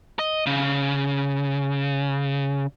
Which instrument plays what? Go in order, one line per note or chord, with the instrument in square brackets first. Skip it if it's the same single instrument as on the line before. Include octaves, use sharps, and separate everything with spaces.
[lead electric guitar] D#5
C#3